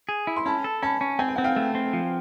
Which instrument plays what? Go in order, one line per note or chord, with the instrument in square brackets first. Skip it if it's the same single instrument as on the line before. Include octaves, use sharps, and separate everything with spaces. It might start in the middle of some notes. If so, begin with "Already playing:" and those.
[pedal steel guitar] G#4
E4
[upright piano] C6
[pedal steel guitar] C#4 [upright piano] A5 B5
[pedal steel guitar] A4
[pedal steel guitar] C#4 [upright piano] A5 B5
[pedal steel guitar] C#4
[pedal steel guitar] C4 [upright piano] G#5
[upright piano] G5
[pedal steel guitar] C4 [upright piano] F#5
[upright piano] F5 G5
[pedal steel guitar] A3
C4
F3